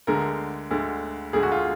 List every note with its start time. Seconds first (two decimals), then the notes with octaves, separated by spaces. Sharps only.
0.07 D2 D3 G#3 A#4
0.71 D2 D3 G#3
1.33 D2 D3 G#3 G#4
1.43 F#4
1.52 F4